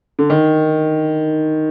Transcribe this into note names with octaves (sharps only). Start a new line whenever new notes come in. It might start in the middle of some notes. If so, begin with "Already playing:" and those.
D3
D#3